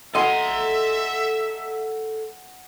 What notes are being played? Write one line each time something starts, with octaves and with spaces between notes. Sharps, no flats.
A4 D#5 E5 F#5 G#5 A#5 C6